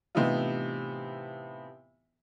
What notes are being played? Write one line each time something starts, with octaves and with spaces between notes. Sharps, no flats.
A2 C3 E3 B3 D#4 F4